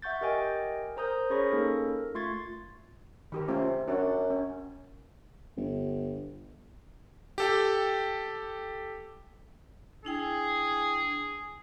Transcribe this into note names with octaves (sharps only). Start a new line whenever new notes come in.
E5 F#5 C#6 G6 A6
G4 A#4 D#5 G5 G#5
A#4 C5 A#5 D#6 G6
C#4 G#4 C#5 B5 C#6 A#6
A#3 C#4 D#4 A4 A#4
A3 F4 C6 C#6 G#6 A6
D#3 G4 A#4
C3 A3 C#4 F4
F#2 C#4 D4 F#4
C#4
G1
G4 A4 G5
D4 E4 G#4 G5